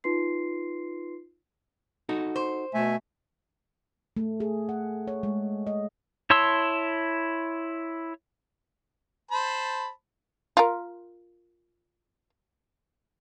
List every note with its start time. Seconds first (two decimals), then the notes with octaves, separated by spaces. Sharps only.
0.04 D#4 F4 B4 C6 C7
2.09 D#4 F#4 A4
2.36 C5
2.74 B2 A3 E5 G#5
4.17 A3
4.40 G#4
4.69 F#5
5.07 C#5
5.23 G#3
5.67 D#5
6.30 E4 C#5 A5 C6 E6
9.31 C5 A5 B5
10.57 F4 A#4